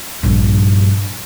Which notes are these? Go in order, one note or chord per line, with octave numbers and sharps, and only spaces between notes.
A#1 G2